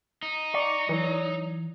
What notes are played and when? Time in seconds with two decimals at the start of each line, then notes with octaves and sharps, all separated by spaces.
0.23 D#4
0.54 D5 C#6
0.89 E3 F#3